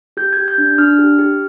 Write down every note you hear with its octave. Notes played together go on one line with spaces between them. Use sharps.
G4 G6
G4 G#6
G6
D4
D4 F6
G4
G4